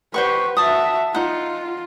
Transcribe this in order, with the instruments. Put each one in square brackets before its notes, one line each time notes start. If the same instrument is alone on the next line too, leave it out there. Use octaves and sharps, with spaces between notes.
[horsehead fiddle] G4 B4 [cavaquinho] C5 F#5 C#6
[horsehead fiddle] F#4 E5 [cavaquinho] A5 D#6
[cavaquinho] D#4 F#5 [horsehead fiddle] F4